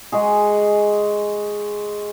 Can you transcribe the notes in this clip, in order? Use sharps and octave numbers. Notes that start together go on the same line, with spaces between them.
G#3 F#4 G#4